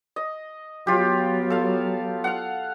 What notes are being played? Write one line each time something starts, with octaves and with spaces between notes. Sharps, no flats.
D#5
F#3 B3 F4 G4
A4 F5
F5 F#5